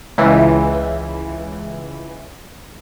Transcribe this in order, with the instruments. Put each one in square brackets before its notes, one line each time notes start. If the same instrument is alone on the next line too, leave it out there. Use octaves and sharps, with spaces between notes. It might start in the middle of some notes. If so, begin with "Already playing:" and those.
[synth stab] C#2 E3